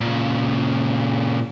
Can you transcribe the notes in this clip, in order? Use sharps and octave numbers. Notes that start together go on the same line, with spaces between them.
A#2 C#3